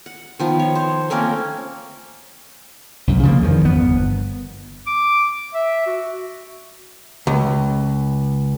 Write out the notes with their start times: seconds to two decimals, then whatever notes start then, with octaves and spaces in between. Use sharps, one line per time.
0.06 F#5
0.39 D#3 F3 B3
0.59 C#5
0.75 C5
1.10 A3 A#3 C4 C#4
3.07 C2 F#2
3.23 C#3 F3 G3 A#3
3.42 E2 D#3 F3
3.65 G1 B3
4.87 D6
5.54 E5
5.86 F#4
7.27 C#2